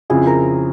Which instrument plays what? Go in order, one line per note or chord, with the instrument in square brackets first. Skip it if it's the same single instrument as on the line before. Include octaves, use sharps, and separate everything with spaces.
[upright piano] F2 C#3 F3 C4 E4 [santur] G#4
[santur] A#4